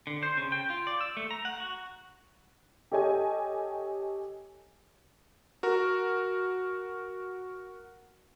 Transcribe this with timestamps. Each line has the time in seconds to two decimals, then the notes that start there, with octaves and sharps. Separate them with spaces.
0.07 D3
0.23 C5
0.37 C#3
0.52 G5
0.70 F4
0.87 D5
1.01 E6
1.17 A3
1.31 A#5
1.45 F#5
1.60 F#4
2.92 G4 A4 C#5 D#5 G#5
5.63 F#4 A#4